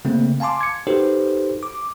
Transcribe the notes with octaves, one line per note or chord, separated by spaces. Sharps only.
C#3 A3 A#3 C4
F5 G#5 A5 C6 D6
G#6 C#7
D#4 F#4 G4 A4 B4 C5
D6